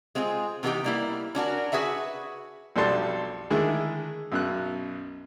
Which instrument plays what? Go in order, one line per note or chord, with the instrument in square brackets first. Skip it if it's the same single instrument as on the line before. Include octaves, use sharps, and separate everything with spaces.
[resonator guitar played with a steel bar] G#3 C4 F4 G#4
C3 E3 B3 D#4 G4 G5
G3 A#3 E4
C#4 D4 F#4 A#4
F#4 G#4 B4 E5 F#5
[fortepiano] B1 F2 G3 D4 A4 C6
D3 D#3 G#3 A3 E4 G#4
B1 F#2 B2 F#6